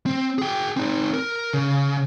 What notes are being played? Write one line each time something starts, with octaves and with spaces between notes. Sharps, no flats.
C4
G#4 G5
C4 D#4
A#4
C#3